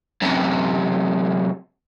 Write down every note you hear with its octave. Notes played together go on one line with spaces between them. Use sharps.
F#2 C3